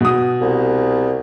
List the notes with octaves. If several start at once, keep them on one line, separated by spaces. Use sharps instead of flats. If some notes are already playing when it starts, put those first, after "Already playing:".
B2 D#6
C2